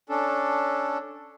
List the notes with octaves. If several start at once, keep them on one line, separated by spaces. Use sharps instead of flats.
C#4 D4 A4